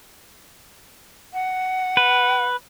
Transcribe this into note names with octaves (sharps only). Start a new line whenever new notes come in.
F#5
B4